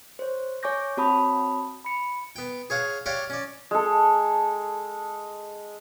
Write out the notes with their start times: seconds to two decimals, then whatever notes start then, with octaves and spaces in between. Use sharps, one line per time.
0.19 C5 C#5
0.63 C#5 G#5 C#6 D6 G6 A#6
0.97 C4 F#4 C#5 A5 B5 D#6
1.85 B5 C#7
2.36 B3 G5
2.70 G#4 C#5 F5 F#5
3.06 G4 C#5 D5 F5 F#5
3.30 C#4 D5
3.71 G#3 A4